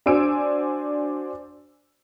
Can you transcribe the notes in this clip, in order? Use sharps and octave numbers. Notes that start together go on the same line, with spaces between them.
D4 F#4 C5 G#5 E6 D7